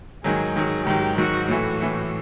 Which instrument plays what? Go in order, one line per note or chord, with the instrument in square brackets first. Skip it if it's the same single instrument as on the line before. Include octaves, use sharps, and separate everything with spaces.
[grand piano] G#2 D#3 F#3 [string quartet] G#4
[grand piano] G#2 D#3 F#3 [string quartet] G#4
[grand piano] G#2 D#3 F#3 [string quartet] G4
[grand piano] G#2 D#3 F#3 [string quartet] F#4
[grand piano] A2 E3 A3 [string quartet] F#4
[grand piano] A2 E3 A3